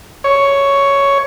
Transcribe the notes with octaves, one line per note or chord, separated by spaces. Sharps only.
C#5